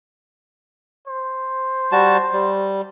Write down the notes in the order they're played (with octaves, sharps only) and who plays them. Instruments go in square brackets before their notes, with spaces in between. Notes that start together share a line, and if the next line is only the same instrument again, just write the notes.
[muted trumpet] C5
[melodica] G3 F#4 A5
G3